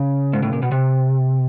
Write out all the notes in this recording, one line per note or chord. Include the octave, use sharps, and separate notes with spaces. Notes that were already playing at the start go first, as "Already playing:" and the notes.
Already playing: C#3
G#2
A2
A#2
B2
C3